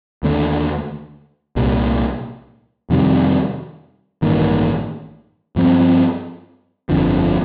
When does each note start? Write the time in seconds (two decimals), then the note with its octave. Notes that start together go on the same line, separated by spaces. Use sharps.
0.23 D#2 D3 A3 D4
1.56 C2 A#2 G3
2.90 F2 C3 D#3 G3
4.22 A1 G2 D#3 A#3
5.56 G2 F3 C4
6.89 G1 F2 D3 F3